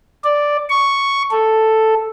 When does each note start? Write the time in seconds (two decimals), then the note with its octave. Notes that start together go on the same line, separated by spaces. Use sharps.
0.24 D5
0.70 C#6
1.31 A4